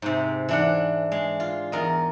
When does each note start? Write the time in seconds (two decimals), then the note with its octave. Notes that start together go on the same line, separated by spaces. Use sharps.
0.02 G#2 C3
0.49 E3 D4 F#5
1.12 G#3
1.40 F4
1.72 E2 A#4 D#5